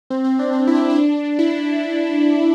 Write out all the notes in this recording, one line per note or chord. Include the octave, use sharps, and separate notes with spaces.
C4
C4
D4
C4
E4
D4
E4
D4
E4